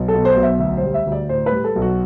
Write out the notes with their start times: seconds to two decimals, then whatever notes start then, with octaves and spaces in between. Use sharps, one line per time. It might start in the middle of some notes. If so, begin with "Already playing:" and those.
Already playing: B1
0.08 A4
0.14 B2
0.25 C5
0.36 B1
0.43 E5
0.59 D2 E5
0.77 C5
0.83 G3
0.94 E5
1.06 D2
1.12 D5
1.29 A2 C5
1.46 B4
1.52 G3
1.64 A4
1.75 B1
1.82 F#4